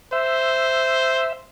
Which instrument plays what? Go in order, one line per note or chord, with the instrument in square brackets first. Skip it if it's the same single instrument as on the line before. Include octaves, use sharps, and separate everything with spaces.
[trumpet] C5 [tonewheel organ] E5